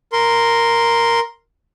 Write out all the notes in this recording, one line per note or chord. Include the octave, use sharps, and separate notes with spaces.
A#4 C6